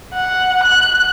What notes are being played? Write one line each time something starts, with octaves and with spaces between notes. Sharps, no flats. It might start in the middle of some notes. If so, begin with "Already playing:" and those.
F#5
F#6